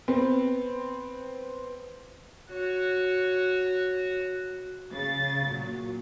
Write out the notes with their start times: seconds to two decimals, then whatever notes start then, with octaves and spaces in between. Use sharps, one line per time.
0.08 B3 C4
2.52 F#4 C#5
4.93 C#3 A6
5.49 A#2 F#3